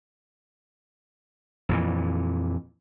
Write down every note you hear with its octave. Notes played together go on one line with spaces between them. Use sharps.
F2 A#2 E3